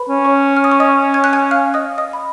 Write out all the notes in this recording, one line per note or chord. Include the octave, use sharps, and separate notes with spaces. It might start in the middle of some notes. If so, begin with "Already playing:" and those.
Already playing: B4 B5
C#4
C#5 C#6
F6
D#6
C#6
D#5 D#6
G#6
F#6
G#5 G#6
F5 F6
D#5 D#6
D#5 D#6
B5